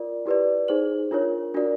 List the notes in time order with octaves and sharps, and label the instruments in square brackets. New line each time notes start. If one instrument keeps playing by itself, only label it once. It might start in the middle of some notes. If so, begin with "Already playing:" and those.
Already playing: [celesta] F4 A#4 D5
E4 G4 B4 D5
D#4 G#4 C5 F#7
D4 F4 A#4 C#5
D4 F#4 A#4 D5